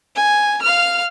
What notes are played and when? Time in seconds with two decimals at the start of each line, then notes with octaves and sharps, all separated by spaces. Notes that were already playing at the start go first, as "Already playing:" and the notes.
0.15 G#5
0.62 F5 F6